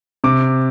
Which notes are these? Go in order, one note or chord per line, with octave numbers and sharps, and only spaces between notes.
C3 D6